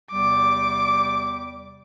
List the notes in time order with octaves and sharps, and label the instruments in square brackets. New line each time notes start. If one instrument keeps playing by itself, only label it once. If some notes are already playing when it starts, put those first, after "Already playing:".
[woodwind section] E2 C3 G3 [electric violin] D6